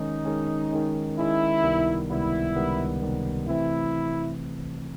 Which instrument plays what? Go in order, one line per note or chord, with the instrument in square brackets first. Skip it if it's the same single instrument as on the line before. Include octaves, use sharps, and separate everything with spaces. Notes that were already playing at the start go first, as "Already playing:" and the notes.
Already playing: [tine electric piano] D#3 G#3 C#4 [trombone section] D#4
[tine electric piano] D#3 G#3 C#4
D#3 G#3 C#4
[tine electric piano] D#3 G#3 C#4 [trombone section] E4
[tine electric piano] C#2 C3 D#3 G3 B3
[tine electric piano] C#2 C3 D#3 G3 B3 [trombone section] E4
[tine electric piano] C#2 C3 D#3 G3 B3
C#2 C3 D#3 G3 B3
[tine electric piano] C3 E3 A3 C4 [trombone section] E4